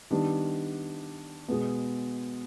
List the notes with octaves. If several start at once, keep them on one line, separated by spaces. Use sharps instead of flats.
D#3 G3 B3 D4
B2 G#3 B3